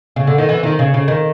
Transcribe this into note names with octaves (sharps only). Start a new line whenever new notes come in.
C#3
D3
D#3
E3
D#3
C#3
C#3
D#3